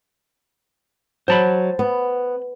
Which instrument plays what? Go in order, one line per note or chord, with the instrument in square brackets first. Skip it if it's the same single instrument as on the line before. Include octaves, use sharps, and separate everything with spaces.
[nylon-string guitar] F#3 [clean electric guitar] C5 A5 B5
[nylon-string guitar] B3